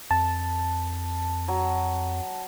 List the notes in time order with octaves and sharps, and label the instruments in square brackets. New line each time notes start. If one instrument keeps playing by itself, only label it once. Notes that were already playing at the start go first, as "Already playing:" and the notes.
[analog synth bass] F2 [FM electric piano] A5
[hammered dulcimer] F#3